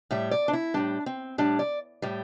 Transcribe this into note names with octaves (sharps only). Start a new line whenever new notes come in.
A2 G3 E5
D5
D4
E4
A2 G3 D4
C4
A2 G3 D4
D5
A2 G3